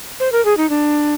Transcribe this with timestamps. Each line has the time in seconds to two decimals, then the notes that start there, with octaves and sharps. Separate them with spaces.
0.20 C5
0.32 A#4
0.45 G#4
0.57 D#4
0.70 D4